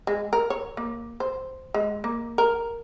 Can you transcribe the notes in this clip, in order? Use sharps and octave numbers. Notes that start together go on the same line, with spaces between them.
G#3
A#4
C#5
A#3
C5
G#3
A#3
A#4